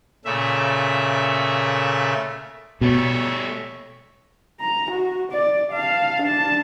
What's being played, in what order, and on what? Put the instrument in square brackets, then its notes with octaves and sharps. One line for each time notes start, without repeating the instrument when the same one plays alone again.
[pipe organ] A#2 C#3 A3 E5
[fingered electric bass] B2 [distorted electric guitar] G3 A3 [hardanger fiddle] C#5 E5
[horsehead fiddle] A#5
F#4
D5
F5 A5
D4 A5